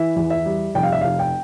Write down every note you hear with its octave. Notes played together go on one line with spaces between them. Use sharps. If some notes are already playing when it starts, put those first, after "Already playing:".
Already playing: E3 E5
E2
E5
G3
F1 G5
F5
E5
F1 F5
G5